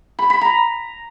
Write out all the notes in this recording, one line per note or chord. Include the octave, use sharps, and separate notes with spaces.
B5
B5
A#5